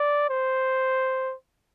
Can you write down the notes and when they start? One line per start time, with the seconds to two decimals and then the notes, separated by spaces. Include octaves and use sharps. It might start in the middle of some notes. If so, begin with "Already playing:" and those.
Already playing: D5
0.30 C5